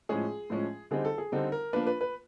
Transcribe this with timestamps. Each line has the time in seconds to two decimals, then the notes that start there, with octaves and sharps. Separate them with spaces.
0.09 A2 F3 G#3 C#4 G#4
0.50 A2 F3 G#3 C#4
0.91 D3 G3 C4 D#4 G#4
1.05 A4
1.18 G#4
1.32 D3 G3 C4 D#4 A4
1.52 A#4
1.73 F3 A#3 D4 B4
1.87 B4
2.01 B4